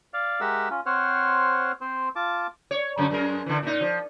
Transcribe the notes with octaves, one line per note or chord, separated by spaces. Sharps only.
D5 F5
G#3 G4 A#4 E5 F#5 E6
C#4 F4
C4 C5 C#5 F#5 F6
C4 C5
F4 A5 D6
C#5
F#2 D3 C#4
F#2 G#3 A#4
D3 E3
A#2 D#4
F3